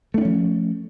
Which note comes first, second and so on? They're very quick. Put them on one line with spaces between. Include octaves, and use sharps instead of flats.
A3 D4 C#4 F3